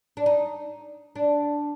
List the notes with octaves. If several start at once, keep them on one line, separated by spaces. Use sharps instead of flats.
D4
D#4
D4